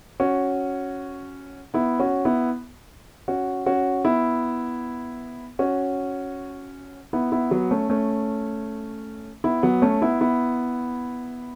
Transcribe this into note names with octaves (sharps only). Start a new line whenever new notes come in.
C#4 F#4
B3 E4
C#4 F#4
B3 E4
C#4 F#4
C#4 F#4
B3 E4
C#4 F#4
B3 E4
B3 E4
F#3 B3
A3 C#4
A3 C#4
B3 E4
F#3 B3
A3 C#4
B3 E4
B3 E4